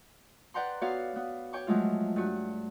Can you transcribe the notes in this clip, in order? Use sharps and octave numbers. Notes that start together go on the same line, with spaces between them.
B4 D5 F#5 G5 A#5 C6
B3 F#4 C#5 D5 F5
B3
C#5 G5 C#6 D6
F3 F#3 G#3 A3 F4
G2 F#4